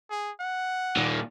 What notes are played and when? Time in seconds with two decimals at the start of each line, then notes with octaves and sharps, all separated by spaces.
0.10 G#4
0.40 F#5
0.97 A#2 D#3